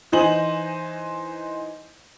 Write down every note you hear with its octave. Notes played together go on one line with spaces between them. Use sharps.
E3 D#4 C5 D#5 G#5 F#7